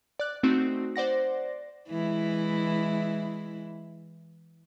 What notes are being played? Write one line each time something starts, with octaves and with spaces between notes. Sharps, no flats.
D5 F#6
A3 C4 D#4 F#4
C5 D5 F#5 A#6
E3 G#3 E4